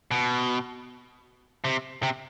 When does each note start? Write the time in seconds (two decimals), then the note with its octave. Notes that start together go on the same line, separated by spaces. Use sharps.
0.11 B2
1.64 C3
2.03 C3